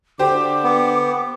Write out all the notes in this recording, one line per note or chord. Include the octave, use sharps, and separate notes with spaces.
D3 G4 C5 D6
B3